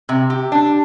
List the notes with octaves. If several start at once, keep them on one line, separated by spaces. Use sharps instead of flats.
C3
G4
D4